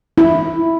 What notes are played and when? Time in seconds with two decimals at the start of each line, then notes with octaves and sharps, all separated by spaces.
0.18 E4